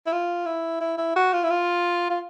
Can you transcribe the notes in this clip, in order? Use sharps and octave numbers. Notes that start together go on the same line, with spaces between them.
E4
F4
E4
E4
E4
F#4
F4
E4
F4
F4